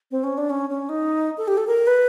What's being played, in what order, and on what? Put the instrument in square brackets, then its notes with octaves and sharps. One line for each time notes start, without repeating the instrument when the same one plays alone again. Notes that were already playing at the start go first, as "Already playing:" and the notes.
[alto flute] C4
C#4
D4
C#4
C#4
D#4
A4
G4
A4
A#4
B4